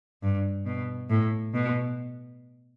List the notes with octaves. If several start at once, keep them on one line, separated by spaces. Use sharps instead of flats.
G2
B2
A2
B2